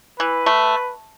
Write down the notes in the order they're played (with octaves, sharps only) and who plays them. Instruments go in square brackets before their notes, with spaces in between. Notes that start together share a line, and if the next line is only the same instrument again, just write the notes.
[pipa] E3 [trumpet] B4
[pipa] A3